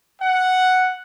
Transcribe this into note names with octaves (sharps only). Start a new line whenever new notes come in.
F#5